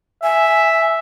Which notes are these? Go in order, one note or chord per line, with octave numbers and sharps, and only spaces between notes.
E5 G#5